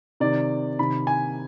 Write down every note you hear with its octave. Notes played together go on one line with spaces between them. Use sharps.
C3 D#3 D5
C3 D#3 B5
G#5